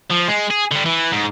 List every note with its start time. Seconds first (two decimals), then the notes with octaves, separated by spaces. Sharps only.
0.10 F3
0.28 G#3
0.50 G#4
0.71 D3 G3
0.85 E3
1.12 G#2